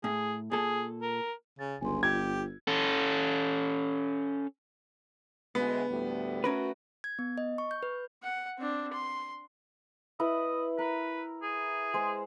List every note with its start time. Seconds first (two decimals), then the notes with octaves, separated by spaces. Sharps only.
0.04 A2 G#4
0.52 A#2 G#4 A4
1.02 A#4
1.59 C#3 A6
1.81 G1 C#2 G#5 C6
2.03 F4 G4 G#6
2.67 C#4 A4
5.55 D2 G#3 B3
5.89 D2 A2 G3
6.44 A3 C#4 F#4 A#4 B4
7.04 G#6
7.19 B3
7.38 D#5
7.58 C#6
7.71 G6
7.83 B4
8.23 F#5
8.58 C4 D4
8.93 C6
10.20 E4 B4 D#5
10.79 A#4 B4
11.42 G#4
11.94 G#3 C5